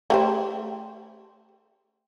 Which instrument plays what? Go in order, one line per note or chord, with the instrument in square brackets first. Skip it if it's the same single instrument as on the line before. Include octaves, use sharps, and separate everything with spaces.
[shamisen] A3 G4 C5